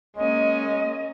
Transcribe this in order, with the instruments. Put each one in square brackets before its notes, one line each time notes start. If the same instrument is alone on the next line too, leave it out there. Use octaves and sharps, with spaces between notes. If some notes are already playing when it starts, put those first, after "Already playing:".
[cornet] G#3 [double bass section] A#3 [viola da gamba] C#4 [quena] D#5